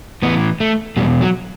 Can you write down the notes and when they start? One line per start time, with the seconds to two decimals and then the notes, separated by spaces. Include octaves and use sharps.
0.22 A2 E3 B3
0.60 A3
0.97 E2 B2 G3
1.21 F#3